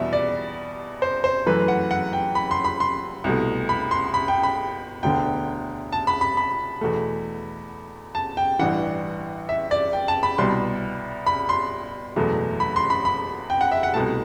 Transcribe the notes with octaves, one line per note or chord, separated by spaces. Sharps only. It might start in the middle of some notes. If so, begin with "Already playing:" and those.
Already playing: E2 B2 G3 E5
D5
C5
C5
F#2 E3 A3 B4
F#5
F#5
G5
B5
C6
B5
C6
C2 B2 A3
B5
C6
B5
G5
B5
E1 D2 D3 G5
A5
B5
B5
B5
E2 B2 A3
A5
G5
A1 G2 E3 F#5
E5
D5
G5
A5
B5
C2 B2 G3 C6
B5
C6
F#1 E2 B2 A3
B5
C6
B5
B5
G5
F#5
E5
F#5
C2 B2 A3 A5